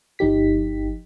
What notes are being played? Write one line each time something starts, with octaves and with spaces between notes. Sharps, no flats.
G1 F3 D#4 G4 B6